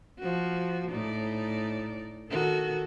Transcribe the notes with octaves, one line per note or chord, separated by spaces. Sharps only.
F3 F#4
A2 D#4 D5
D#3 F#4 A4